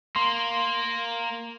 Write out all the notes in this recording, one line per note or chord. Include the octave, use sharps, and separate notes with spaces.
A#3 C6